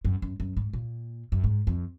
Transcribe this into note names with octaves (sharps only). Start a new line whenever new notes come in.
F#2
F#2
F#2
G#2
A#2
F#2
G#2
F2